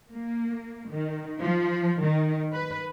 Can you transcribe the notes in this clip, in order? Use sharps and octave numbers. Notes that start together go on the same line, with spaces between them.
A#3
D#3
F3
D#3
B4